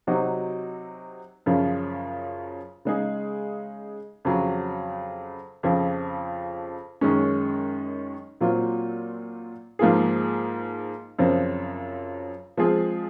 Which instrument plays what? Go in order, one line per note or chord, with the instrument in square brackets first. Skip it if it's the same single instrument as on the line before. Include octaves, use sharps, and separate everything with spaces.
[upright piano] C3 F#3 C4 D#4 F#4
F#2 C#3 F3
C#3 G#3 D#4 G#4
F2 C#3 F#3
F2 C#3 F3
F#2 D#3 G#3 C#4
A#2 F#3 C4 F4
G#2 F3 A#3 F4 G#4
F#2 C#3 F3 C4
F3 G#3 C4 F4 G#4